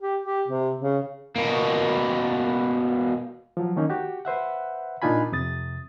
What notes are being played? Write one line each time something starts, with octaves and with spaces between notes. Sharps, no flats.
G4
G4
C3
C#3
B2 A#3
F3 F#3
D#3 A#3 C#4 D#4
F#4 G4
B4 C5 E5 F#5
A#2 D4 D#4 F4 G#5 B5
F2 C3 D#6 A6